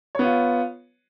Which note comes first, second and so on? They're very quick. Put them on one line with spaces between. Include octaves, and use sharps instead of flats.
C#5 B3 F4